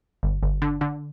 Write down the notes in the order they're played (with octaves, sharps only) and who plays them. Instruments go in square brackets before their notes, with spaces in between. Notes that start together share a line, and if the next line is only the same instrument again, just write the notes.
[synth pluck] G1
G1
D3
D3